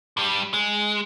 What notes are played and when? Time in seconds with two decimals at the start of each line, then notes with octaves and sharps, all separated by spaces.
0.17 G2 G3
0.54 G#3